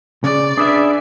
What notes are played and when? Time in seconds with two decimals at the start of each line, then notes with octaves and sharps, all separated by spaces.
0.24 C#3 D5
0.58 D4 G#4 B4 E5